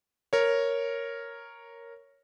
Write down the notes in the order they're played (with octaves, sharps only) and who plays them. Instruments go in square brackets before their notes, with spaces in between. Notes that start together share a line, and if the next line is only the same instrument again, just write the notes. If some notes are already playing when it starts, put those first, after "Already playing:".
[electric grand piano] A#4 C#5